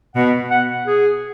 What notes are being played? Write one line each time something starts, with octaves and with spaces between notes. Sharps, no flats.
B2 F#5
F#5
G#4